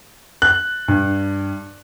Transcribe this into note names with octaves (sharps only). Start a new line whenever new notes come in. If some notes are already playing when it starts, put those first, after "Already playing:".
F#6
G2